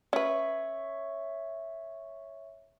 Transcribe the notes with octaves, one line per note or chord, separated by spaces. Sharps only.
C#4 B4 C#5 E5 C#6